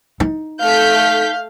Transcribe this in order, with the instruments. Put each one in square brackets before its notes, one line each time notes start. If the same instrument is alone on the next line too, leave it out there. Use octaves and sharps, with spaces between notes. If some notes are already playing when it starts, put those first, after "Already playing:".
[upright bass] D#4
[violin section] A3 G6 B6 [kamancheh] F5